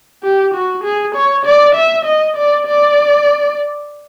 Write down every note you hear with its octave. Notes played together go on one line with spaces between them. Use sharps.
G4
F#4
G#4
C#5
D5
E5
D#5
D5
D5